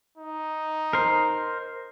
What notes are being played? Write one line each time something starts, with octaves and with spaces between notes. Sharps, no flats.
D#4
A#4 C5